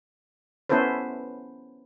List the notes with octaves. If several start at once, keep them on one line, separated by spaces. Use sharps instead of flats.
B3 C#4 E4 A4 B4 C5